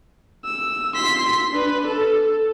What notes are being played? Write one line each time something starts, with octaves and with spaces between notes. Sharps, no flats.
E6
C6 B6
D4 B4
A4